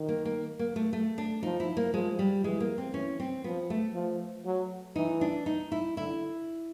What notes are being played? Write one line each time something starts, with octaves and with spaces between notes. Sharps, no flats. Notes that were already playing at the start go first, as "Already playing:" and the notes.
Already playing: D#3
A#3
A#3
A#3
A3
A3
D4
F3 D#4
E4
A#3
F3 G#3
G3
E3 G#3
A#3
C4
E3 C#4
C4
F3 B3
A3
F3
F#3
E3 D#4
D4
D#4
E4
D3 E4